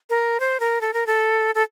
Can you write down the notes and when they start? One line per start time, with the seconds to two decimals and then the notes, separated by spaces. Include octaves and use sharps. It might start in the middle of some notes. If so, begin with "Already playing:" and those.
0.10 A#4
0.40 C5
0.60 A#4
0.81 A4
0.93 A#4
1.07 A4
1.55 A4